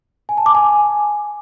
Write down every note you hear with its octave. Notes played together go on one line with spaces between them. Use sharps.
G#5
A5
D6
G#5